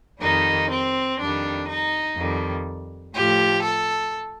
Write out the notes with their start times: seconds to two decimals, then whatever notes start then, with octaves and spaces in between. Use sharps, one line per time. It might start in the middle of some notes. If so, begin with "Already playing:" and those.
0.20 F2 D#3 G3 D#4
0.69 C4
1.18 F2 D#3 G3 D4
1.67 D#4
2.16 F2 D#3 G3
3.13 A2 F3 G4
3.62 A4